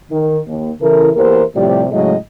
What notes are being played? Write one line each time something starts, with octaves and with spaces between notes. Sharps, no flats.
D#3
D#2
C#3 E3 E4 A4 A#4
E2 E3 A#3 G4 A#4 C5
A2 C3 F3 G3 G4 D5
A2 C#3 F#3 G#3 A3 D#5